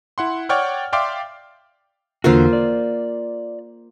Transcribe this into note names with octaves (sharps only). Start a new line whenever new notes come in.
E4 F#5 C6
C#5 D5 F#5 G5 C#6 F6
D5 E5 F5 G5 C6 D6
E2 D3 A#3 F4 F#4 C5
D5